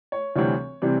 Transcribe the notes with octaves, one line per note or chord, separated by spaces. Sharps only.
C#5
D2 C3 E3 G3 C4 C#5
C3 E3 G3 C4